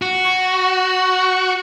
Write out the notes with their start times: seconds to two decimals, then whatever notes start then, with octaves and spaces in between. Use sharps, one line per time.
0.02 F#4
0.24 C#6